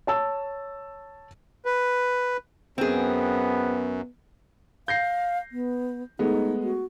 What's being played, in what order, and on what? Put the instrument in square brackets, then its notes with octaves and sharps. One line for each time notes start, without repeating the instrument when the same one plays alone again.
[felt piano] C#5 A5 E6
[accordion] B4
[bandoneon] F#2 [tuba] B3 [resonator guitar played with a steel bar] C4 G#4
[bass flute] F5 [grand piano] G6 A#6 C7
[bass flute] B3
[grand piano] G#3 A3 B3 [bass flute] D#4
[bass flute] F#4